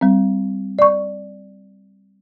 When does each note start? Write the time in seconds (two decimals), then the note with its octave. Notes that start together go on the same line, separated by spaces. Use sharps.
0.01 G3 C4
0.79 D5 C#6